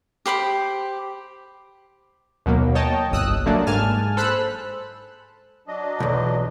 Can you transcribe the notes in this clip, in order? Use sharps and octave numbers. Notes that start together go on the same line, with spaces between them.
G4 C5 B5 D6
D#2 B2 F#3 A#3
C#5 D#5 G5 A5
G1 C2 D#6 E6 F#6
D3 F#3 A3 A#3 D4
G#2 G#5 A5 F6
A4 C5 B5 E6 F#6
F#3 D4 D#5
B1 E2